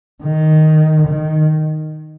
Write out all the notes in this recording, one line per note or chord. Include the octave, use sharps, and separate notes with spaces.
D#3
D#3